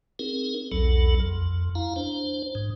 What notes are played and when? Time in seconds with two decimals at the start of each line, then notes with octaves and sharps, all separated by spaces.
0.19 C4 D#4 G#4 A#4
0.72 B1 E2 F#3 A4
1.20 F2
1.75 E4 F5 A#5
1.96 D4 C5
2.55 G#2